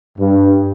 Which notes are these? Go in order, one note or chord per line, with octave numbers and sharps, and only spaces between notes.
G2